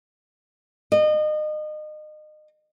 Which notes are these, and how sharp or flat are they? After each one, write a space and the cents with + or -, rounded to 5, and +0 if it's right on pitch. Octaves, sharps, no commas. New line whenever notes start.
D#5 -30